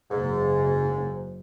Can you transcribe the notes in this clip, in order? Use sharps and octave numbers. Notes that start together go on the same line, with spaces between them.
F#1 G#2